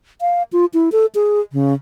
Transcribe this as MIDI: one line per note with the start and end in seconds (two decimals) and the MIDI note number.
0.21 0.43 77
0.53 0.65 65
0.74 0.89 64
0.92 1.06 69
1.15 1.40 68
1.52 1.74 49